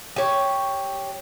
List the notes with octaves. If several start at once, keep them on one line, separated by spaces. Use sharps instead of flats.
G4 C#5